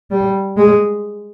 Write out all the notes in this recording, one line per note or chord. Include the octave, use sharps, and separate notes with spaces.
G3
G#3